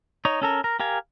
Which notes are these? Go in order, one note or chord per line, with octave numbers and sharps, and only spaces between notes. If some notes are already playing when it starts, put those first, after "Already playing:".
D#4 C#5
C#4 A4 A#4
A#4
G4 A#4 F5 G#5